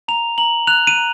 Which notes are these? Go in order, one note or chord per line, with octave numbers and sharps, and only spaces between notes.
A#5 F7
A#5 F#7
F#6 F7
D#7
A#5